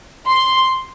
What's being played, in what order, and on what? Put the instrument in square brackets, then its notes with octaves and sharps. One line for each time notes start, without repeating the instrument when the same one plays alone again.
[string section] C6